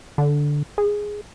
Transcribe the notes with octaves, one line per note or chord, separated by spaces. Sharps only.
D3
G#4